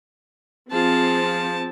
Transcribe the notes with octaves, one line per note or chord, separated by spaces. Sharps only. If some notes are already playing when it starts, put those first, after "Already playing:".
F3 C4 F4 G#4 A5